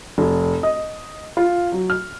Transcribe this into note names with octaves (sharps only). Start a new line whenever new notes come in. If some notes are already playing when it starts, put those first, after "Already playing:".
F1
D#5
F4
F#3
F6